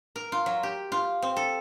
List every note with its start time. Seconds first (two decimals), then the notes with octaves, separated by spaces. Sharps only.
0.16 A#4
0.32 F4
0.46 F#3
0.63 G4
0.92 F4
1.22 C4
1.36 A4